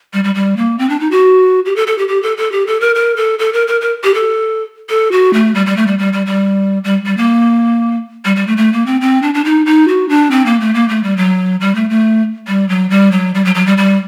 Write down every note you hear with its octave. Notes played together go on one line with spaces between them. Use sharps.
G3
G3
G3
A#3
C4
D4
D#4
F#4
G4
A4
A4
G4
G4
A4
A4
G4
A4
A#4
A#4
A4
A4
A#4
A#4
A#4
G4
A4
A4
F#4
A3
G3
G3
A3
G3
G3
G3
G3
G3
G3
A#3
G3
G3
A3
A3
A#3
C4
C4
D4
D4
D#4
D#4
F#4
D4
C4
A#3
A3
A#3
A3
G3
F#3
G3
A3
A3
G3
F#3
G3
F#3
G3
F#3
F#3
G3
G3